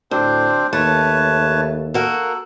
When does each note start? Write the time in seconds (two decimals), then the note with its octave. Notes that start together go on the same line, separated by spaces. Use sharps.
0.11 D2 A2 C4 D4 C5
0.73 D#2 A3 B4 C#5 A5
1.94 A#3 F#4 A4 A#4